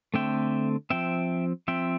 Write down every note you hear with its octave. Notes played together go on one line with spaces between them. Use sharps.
D3 A3 C4 E5 G5
F3 C4 E5 G5
F3 C4 E5 G5